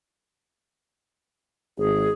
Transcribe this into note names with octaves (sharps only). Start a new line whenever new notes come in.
G#1 G#4